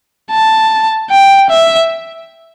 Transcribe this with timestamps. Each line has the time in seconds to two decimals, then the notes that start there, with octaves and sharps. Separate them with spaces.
0.31 A5
1.11 G5
1.50 E5